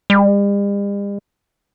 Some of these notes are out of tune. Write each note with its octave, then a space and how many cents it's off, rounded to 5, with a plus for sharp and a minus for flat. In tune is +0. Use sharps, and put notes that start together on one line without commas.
G3 +45